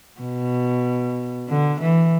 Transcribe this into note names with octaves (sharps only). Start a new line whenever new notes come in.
B2
D3
E3